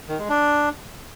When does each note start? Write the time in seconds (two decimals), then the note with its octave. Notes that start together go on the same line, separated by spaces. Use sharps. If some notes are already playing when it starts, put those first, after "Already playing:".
0.09 D#3
0.19 G#3
0.29 D4